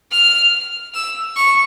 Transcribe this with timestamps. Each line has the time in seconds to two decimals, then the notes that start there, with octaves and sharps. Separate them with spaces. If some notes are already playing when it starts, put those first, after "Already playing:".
0.12 F6
0.94 E6
1.36 C#6